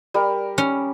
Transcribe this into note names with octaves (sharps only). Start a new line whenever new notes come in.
G3 A#4
C#4